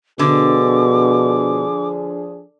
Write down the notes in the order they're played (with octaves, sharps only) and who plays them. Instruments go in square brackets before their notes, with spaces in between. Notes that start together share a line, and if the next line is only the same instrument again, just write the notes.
[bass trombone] B2 [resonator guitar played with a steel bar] D3 [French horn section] F3 D4 G#4 [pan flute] D6